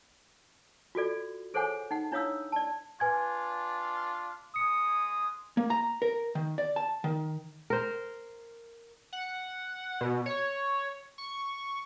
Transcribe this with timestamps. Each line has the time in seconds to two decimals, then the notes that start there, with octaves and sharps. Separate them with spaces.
0.95 F4 F#4 A4 D5
1.54 G#4 A4 C5 C#5 F#5 G#5
1.91 D#4 F#5
2.12 D4 E4 C#5 F5 D#6 E6
2.52 D5 A5
3.00 D4 F4 B4 G#5 G#6
4.56 G#3 D#6 C#7
5.57 A#3
5.70 A#5
6.02 A#4
6.35 D#3
6.58 D5
6.76 A5
7.04 D#3
7.70 A#4 C5
9.13 F#5
10.01 B2
10.26 C#5
11.18 C#6